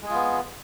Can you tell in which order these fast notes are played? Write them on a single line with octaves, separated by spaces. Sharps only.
G#3 G#4 F4 B3